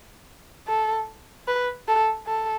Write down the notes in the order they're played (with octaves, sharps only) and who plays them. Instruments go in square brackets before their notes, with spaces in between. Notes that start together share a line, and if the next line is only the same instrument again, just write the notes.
[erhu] A4
B4
A4
A4